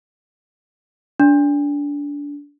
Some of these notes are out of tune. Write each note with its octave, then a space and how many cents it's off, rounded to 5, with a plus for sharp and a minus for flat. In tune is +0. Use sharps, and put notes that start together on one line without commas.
D4 -25